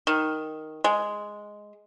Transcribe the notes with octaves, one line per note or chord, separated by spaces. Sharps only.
D#3
G#3